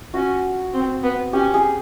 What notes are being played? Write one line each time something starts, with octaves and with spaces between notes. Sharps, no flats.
C#4 F#4
C4
B3
C#4 G4
G#4